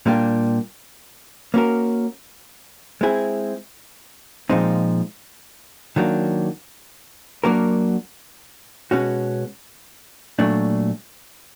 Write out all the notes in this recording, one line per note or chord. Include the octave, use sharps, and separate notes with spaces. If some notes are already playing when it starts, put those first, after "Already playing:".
A#2 G3 A#3 D4 G4
A#3 C#4 F#4 A#4
G#3 C4 E4 G#4
A#2 F3 G#3 C4 D#4
D#3 F#3 A#3 D4
F#3 A#3 D4 F#4 A#4
B2 G#3 C#4 F#4
A#2 F#3 A3 D4